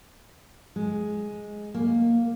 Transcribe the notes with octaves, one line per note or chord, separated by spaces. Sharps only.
G#3
A#3